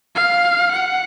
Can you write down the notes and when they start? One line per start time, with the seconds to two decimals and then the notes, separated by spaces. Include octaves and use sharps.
0.16 F5
0.72 F#5